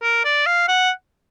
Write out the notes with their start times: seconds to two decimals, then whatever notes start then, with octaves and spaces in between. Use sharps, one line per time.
0.03 A#4
0.24 D5
0.47 F5
0.68 F#5